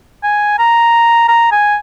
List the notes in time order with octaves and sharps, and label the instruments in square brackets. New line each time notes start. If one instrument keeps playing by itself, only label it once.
[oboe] G#5
A#5
A#5
G#5